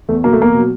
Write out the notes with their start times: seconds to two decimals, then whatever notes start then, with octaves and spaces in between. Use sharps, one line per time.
0.09 E2 A3
0.24 B2 F#3 A#3
0.33 A3
0.39 E2 A#3
0.54 B2 F#3